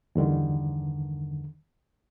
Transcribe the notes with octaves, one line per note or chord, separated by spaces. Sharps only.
E2 G2 D3 D#3